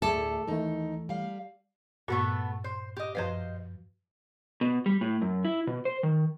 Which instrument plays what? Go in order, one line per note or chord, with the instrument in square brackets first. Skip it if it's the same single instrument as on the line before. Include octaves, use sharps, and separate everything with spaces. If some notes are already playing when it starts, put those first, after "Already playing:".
[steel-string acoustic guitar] D2 A2 A3 [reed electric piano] G#4 E5 D6 [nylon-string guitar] A4
[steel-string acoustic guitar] D#2 D#4 [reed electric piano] E3 A3
[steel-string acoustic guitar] G3 F5
[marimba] G2 A#2 F#4 [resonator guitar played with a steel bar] A3 B3 A4
[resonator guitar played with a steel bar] C5
G4 D#5
[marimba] F#2 F3 B4 [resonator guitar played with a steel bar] C5 D#5 F5
[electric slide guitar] B2
G3
A2
F#2
E4
B2
C5
D#3